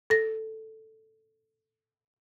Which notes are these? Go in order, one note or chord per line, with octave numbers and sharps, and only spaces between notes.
A4 A#6